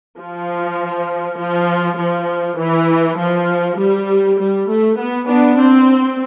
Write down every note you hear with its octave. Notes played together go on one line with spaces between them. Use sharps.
F3
F3
F3
E3
F3
G3
G3
A3
B3
B3 D4
C4